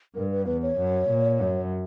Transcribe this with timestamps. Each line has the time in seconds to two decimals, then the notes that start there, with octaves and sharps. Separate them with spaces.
0.15 G2 A#4
0.31 B4
0.46 E2 B4
0.62 C#5
0.78 F#2
1.09 A#2
1.40 F#2